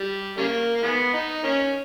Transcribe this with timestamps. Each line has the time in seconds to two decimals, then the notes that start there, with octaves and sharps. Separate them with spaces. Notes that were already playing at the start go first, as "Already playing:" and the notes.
Already playing: G3
0.37 C#3 G3 A#3
0.76 A#3
0.83 D#3 G#3 B3
1.14 D#4
1.43 A#3 C#4